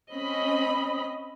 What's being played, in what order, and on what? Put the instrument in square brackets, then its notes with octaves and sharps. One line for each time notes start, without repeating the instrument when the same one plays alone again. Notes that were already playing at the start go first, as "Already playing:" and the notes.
[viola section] C4 C#4 D#5 B5